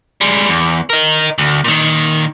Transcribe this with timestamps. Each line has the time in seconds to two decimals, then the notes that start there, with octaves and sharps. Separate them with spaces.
0.21 G3 G#3
0.49 E2
0.90 A#4 D#5
1.38 D2
1.64 A#2 D#3